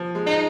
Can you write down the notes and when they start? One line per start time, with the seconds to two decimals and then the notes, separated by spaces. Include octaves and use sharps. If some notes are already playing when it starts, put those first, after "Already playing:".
Already playing: F3
0.15 G#3
0.26 D#4